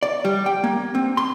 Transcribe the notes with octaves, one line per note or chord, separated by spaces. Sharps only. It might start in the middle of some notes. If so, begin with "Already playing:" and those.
D5
G3
G5
A#3
C4
C6